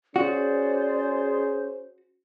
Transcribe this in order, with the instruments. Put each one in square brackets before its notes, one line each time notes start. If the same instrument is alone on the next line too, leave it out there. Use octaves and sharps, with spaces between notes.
[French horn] C#4 [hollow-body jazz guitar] F#4 [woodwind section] G#4 C5 [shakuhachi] D5